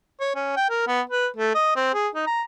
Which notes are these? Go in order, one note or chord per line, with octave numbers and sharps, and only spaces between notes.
C#5
C#4
G5
A#4
B3
B4
A3
D#5
C4
G#4
D#4
A#5